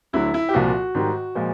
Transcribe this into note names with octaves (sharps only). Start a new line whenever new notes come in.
D2 D3 F#3 E4
E4
G4
C2 A#2 F3 F#4
G#2 D#3 G3
A#2 F3 G#3